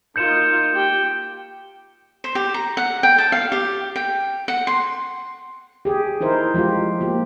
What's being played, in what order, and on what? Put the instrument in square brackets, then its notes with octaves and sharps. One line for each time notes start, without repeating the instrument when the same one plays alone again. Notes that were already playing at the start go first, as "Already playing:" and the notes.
[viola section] A#3 D#4 F4 [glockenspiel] G6 C#7 E7
[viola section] G4 G5
[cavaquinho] C5
G4
A#5
F#5
G5
A5
F5
G4
G5
F#5
C6
[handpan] G4 G#4
D#4 E4 A#4 C5
F3 G#3 F4 G4
A#3 G4